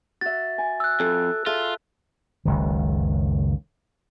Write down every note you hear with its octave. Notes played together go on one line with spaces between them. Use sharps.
F#4 E5 A6
G#5
E6 F#6
F2 A4
F4 G#4 A4 E5
F#1 C#2 D#3